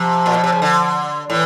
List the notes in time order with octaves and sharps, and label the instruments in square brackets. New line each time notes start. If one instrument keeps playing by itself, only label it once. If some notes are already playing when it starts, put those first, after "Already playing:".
Already playing: [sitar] C3 [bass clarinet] F3
[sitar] A#2
B2
C3
C#3
D3
[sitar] A2 [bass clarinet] E3